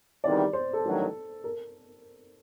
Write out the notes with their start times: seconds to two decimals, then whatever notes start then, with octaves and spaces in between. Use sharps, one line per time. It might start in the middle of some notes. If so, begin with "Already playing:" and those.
0.23 E2 C3 D#3 G3 D5
0.53 C5
0.73 A4
0.83 A1 G2 D#3 F#3
1.44 A#4